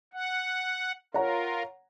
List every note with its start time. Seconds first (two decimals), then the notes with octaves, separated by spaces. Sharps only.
0.13 F#5
1.14 F4 A#4 C#5 F#5 A#5